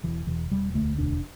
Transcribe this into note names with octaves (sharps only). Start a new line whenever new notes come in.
E1 E3
E1 E3
E1 G3
D2 A3
E1 D4